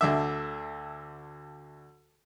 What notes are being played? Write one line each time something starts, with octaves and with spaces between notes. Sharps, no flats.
D2 D3 E5